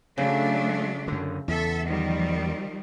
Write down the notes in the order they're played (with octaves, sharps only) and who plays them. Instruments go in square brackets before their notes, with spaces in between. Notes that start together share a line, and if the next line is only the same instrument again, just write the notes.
[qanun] C#3 [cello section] F#3 A3 D4
[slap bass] F#2 D3
[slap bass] E2 [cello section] A4 E5
[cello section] D#3 F3 G3